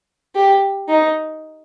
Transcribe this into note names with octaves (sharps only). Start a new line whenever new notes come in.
G4
D#4